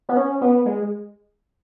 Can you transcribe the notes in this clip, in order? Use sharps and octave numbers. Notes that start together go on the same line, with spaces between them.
B3
C#4
B3
G#3